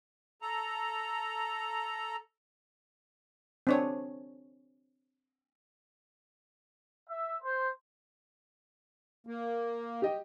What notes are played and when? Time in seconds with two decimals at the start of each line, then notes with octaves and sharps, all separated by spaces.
0.42 A4 A#5
3.67 C4 D4 C#5
7.09 E5
7.42 C5
9.27 A#3
10.02 G4 D#5 G5